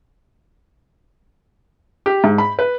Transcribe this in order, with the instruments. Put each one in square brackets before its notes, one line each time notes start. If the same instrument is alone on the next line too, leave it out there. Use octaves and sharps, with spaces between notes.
[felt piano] G4
G#2
B5
B4